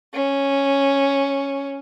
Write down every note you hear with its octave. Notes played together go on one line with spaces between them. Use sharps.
C#4